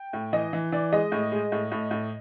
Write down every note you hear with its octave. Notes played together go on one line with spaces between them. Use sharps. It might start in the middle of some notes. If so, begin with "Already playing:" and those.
Already playing: G5
A2
E3 D#5
E3
E3 D5
G#3 D#5
A2
G#3
A2
A2
A2